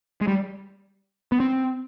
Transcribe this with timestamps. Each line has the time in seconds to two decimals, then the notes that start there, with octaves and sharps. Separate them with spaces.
0.21 G#3
0.28 G3
1.32 B3
1.40 C4